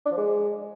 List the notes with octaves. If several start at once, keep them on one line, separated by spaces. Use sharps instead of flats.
D4
F3
G#3